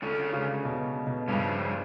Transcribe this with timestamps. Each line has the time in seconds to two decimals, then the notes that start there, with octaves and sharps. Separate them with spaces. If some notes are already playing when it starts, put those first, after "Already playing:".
0.02 D3 G#3 C#4 F4
0.33 C#3
0.65 B2
1.07 B2
1.28 G2 C#3 F3 G#3 C#4